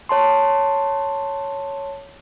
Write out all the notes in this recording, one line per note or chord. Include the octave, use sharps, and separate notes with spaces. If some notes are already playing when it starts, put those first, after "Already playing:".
C#5 A5 C6